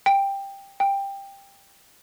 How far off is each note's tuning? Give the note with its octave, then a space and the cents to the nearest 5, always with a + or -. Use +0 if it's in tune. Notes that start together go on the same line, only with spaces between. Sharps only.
G5 +10
G5 +15